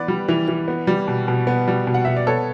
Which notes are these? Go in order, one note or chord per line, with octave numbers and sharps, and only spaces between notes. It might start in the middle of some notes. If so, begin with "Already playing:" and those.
Already playing: E3 B3 B4 D5
G3
E3
E3
B3
G3
B2
B2
B3
G3
B2
F#5
B2 E5
D5
B3 A4 C#5